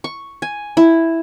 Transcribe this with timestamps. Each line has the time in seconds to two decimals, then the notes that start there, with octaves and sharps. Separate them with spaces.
0.04 C#6
0.42 G#5
0.77 E4